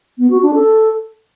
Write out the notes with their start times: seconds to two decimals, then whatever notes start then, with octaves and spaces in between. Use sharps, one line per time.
0.18 B3
0.30 F#4
0.42 D4
0.54 A4